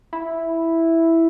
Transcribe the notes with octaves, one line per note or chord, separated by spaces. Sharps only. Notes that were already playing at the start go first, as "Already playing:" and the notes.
E4